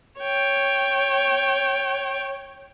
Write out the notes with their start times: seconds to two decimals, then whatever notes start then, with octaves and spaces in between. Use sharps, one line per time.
0.19 C#5 G5